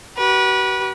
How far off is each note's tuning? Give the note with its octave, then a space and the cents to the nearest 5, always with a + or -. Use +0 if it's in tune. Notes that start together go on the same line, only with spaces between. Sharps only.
F#4 +45 B4 -25